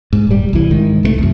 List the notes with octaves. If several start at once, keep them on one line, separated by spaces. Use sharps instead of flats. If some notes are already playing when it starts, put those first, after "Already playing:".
G#2
D#1 G3
C2 E3
G#2 D#3
C2 F#3 A3
C2 F#2